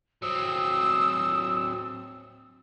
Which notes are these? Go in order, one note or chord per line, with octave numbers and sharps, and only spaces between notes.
F#3 C4 D#6 E6